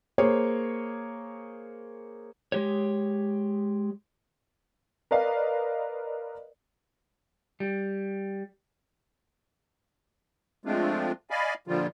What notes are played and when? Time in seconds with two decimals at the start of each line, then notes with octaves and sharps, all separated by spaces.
0.18 A#3 G#4 C5 C#5
2.52 G#3 G4 C#5
5.11 A#4 B4 D5 D#5 F5
7.60 G3
10.65 F3 G#3 A3 C4 D4 F4
11.30 D5 D#5 F5 G#5 B5
11.67 A#2 D3 F3 G3 F4